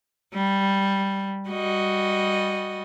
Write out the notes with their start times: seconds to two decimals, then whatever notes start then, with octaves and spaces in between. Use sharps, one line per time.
0.34 G3
1.49 G3 F#4 D#5